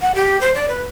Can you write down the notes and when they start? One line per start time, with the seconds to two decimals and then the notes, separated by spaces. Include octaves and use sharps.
0.02 F#5
0.15 G4
0.41 C5
0.54 D5
0.68 B4